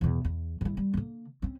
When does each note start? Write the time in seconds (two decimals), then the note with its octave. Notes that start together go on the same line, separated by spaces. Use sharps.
0.01 E2 B2
0.25 E2
0.61 G2 E4
0.77 G3
0.94 D3 A#3
1.42 C4 C#4